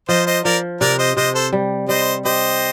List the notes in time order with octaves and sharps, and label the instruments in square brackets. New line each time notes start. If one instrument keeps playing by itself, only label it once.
[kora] F3 [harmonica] C5 D#5
[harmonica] C5 D#5
[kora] F3 [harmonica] A#4 D5
[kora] C3 [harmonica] A#4 D5
[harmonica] C5 D#5
[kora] C3 [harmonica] C5 D#5
[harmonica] A4 C5
[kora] G3
[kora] G3 [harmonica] C5 D#5
[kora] G4 [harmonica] C5 D#5